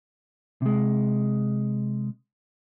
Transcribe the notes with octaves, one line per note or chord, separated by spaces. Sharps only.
C3 G#3